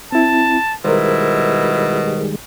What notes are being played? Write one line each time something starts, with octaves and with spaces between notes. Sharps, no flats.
C4 E4 A5
B2 D#3 G3 G#3 E4 A#4 C5